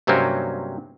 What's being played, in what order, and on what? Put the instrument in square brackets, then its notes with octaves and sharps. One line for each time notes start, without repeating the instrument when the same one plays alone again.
[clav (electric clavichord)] G2 C3 F#3 A#3 C4 C#4